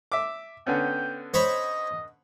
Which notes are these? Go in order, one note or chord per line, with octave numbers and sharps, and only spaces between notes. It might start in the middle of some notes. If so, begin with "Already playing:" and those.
E5 D6
D3 B3 C#4 G5
C5 C#5 D#5 B5